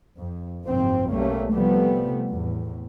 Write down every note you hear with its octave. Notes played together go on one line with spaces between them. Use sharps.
F2
F#1 D#2 G#2 C3 F3 C4
B1 B2 G3 A3 A#3 C#4
C3 F3 G3 A3 B3
E2 A2